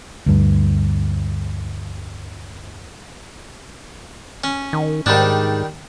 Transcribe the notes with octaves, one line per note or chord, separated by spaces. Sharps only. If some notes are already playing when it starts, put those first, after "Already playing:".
D2 G2
C#4
D#3
G#2 D#3 G3 D4